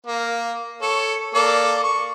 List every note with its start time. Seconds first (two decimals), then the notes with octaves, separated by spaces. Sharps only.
0.07 A#3
0.82 A4 C#5
1.35 A#3 A4 D5
1.84 C#6